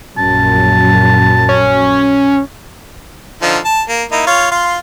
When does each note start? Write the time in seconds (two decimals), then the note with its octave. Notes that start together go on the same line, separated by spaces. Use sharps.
0.18 A#1 F#2 A5
1.49 C#4
3.42 D3 F3 D#4
3.65 A5
3.89 A#3
4.12 A#3 D#4 E4
4.27 F4 C#5
4.51 F4 C6